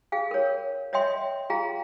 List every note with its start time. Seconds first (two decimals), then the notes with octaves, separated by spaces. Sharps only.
0.12 G#4 F5 G5
0.31 A#4 C#5
0.93 C#5 D#5 E5 G5 C6
1.50 F4 G#4 F5 G5 A#5